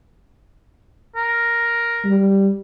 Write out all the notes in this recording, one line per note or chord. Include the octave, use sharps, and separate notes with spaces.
A#4
G3